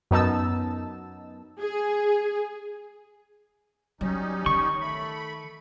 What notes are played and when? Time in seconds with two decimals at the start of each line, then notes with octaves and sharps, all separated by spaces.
0.11 F#2 B3 D#4 A5 E6
1.59 G#4
4.01 F#3 G3 C#4 D#4
4.46 D#3 C#6
4.81 A3 B5